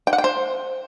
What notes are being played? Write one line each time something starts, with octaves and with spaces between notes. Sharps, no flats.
G5
F#5
G5
C5